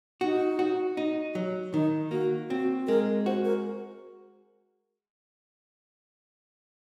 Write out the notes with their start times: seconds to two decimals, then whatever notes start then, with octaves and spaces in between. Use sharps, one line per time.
0.21 D#4 F#4
0.59 F#4
0.97 D#4
1.35 F#3
1.73 D#3 D#4
2.11 A#3 F#4
2.50 C4 F#4
2.87 G#3 A#4
3.26 F#4 C5
3.45 A#4